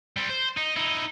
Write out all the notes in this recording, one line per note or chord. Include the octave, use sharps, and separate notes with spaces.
G3 C4
C5
D#4
D#4 E4